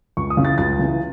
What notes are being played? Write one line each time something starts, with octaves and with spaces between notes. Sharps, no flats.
C#2 C#6
D#6
C#3 E3
A6
C#2 A6
C#3 E3